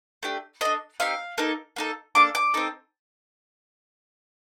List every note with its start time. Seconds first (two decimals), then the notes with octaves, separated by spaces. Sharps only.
0.23 A3 D4 G4
0.61 D4 A4 D#5
1.00 C4 D#4 G4 F5
1.38 A#3 D#4 A4
1.76 A#3 D#4 A4
2.15 A#3 D4 A4 D6
2.35 D6
2.54 C4 D#4 A4